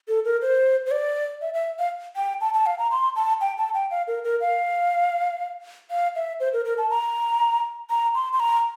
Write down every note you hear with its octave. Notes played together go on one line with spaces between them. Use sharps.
A4
A#4
C5
C5
D5
E5
E5
F5
G5
A5
A5
F5
A#5
C6
A5
G5
A5
G5
F5
A#4
A#4
F5
F5
E5
C5
A#4
A#4
A5
A#5
A#5
C6
C6
A#5